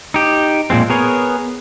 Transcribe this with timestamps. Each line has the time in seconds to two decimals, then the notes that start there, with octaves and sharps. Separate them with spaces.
0.14 D#4 G4
0.70 A#2 F3 G#3 C4
0.90 B3 G#4 A#4 C#5